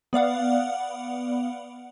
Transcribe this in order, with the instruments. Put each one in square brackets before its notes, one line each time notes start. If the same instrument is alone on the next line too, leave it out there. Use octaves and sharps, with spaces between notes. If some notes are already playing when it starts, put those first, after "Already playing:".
[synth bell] B3 D5 F5 F#5